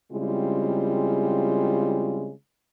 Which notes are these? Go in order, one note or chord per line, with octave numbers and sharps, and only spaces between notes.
C#3 G3 G#3 C4 E4 F4